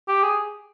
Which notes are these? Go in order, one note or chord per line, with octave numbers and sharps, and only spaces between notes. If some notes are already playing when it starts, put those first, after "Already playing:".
G4
G#4